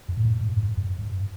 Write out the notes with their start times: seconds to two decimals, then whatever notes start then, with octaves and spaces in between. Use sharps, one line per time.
0.09 F#2
0.17 A2
0.25 G#2
0.41 G#2
0.57 G2
0.77 F#2
0.99 G2